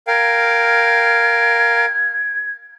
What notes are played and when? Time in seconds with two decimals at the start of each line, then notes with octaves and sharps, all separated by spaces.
0.07 A#4 F5 G5 G#6